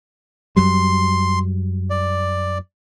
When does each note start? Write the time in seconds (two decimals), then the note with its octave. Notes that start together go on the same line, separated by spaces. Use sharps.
0.56 F#2 F#3 G3 C6
1.90 D5